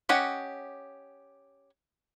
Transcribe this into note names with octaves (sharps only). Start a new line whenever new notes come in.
C#4 G4 D#5 F#5